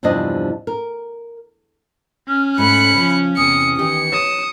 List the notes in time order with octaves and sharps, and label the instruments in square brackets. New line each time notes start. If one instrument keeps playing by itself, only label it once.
[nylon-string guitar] E2 G2 C3 F3 D4 D#5
A#4
[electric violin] C#4 [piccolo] F6
[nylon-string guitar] G#2 A3 [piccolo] B5 [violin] F#6 C#7
[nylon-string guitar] C#3 F3
[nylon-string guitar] E2 A2 C3 [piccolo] D#6 [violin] C#7
[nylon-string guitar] D#3 E3 G4 [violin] C#7
[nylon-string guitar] C#5 [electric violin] D#6 [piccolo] E7